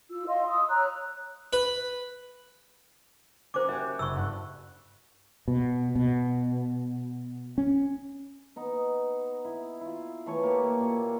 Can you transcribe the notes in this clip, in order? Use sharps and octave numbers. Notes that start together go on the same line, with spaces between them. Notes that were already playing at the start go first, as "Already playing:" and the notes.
F4 E6
D#5 F5 C6
C6 D#6 E6
C#5 A#5 E6 F#6
B4
C#4 F#4 A#4 C5 D6
F#4 G4 C#5 E5
F#1 C#6 E6
G2 F#5 F#6
B2
B2
C#4
B3 D#4
E4
E4 F4
E3 A3 C#5
A#3 G4 A4
A#2 C#6